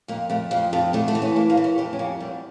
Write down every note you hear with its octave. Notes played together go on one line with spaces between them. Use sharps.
F2 A#3
F2 A3
F2 F3
F2 F3
E2 A3
A3
E3
C#4
A2 A#3
A#3
E3
C#4
F2 G4
C#4
F2 A#3
E2 G3